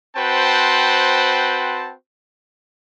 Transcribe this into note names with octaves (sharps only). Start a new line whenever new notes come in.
C4 F#4 B4 C5 G5 A5